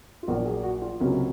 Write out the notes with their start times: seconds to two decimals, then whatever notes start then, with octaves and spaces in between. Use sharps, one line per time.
0.23 F4
0.28 A#1 A#2 F#3 A#3 F#4
0.45 G#4
0.63 F#4
0.82 F4
1.00 C#2 C3 F#3 A#3 C#4